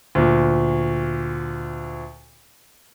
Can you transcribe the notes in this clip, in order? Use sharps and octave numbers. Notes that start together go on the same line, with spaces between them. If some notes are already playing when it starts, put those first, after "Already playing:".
D2 A#2